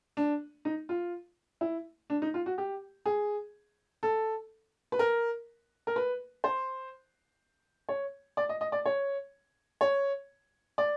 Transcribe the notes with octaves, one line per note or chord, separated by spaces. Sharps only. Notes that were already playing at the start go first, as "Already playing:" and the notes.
D4
D#4
F4
E4
D4
D#4
F4
F#4
G4
G#4
A4
B4
A#4
A#4
B4
C5
C#5
D5
D#5
D#5
D5
C#5
C#5
D5